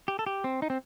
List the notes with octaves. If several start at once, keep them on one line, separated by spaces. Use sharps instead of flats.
G4
A4
G4
C4
D#4
C4